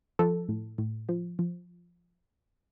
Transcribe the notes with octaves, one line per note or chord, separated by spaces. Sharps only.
F3 A4
A2
A2
F3
F3